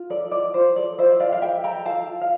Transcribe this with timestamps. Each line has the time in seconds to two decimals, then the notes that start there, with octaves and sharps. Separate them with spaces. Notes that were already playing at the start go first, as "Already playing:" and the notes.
Already playing: F4
0.10 A4 D5
0.31 F4 D5
0.54 F4 C5
0.76 A4 D5
0.98 F4 C5 E5
1.20 A4 D5 F5
1.32 F5
1.42 A4 E5 G5
1.63 A4 G5 A#5
1.86 A4 F5 A5
2.07 F4
2.21 F5